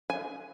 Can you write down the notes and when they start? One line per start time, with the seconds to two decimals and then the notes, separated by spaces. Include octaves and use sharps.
0.10 G#5